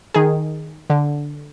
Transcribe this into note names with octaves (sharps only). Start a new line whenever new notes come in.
D#3 G#4
D3